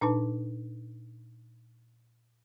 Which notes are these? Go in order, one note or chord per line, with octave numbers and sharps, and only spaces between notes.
A#2 D4 D#4 B4 A5